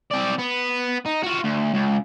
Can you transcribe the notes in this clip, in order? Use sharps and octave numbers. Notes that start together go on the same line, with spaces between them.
C4 D5
B3
D#4
F4 F#4
D2
C#2